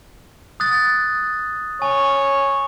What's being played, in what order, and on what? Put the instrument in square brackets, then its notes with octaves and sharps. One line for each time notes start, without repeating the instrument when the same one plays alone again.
[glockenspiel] D#6 F#6 A6
[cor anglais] C#5 [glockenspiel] G#5